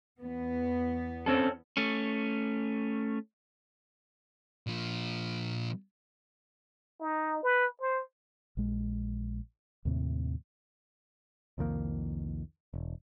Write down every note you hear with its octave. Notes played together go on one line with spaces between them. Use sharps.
E2 B3
C4 C#4 A4
A3 C#4
A#2 F3
D#4
B4
C5
A#1 G#3
D#2 A2 C3
C2 F2 D#3 A#3
E1